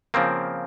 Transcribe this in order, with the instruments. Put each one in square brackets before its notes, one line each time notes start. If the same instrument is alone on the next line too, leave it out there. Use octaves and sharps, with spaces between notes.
[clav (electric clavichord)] C#3 F3 A#3 C4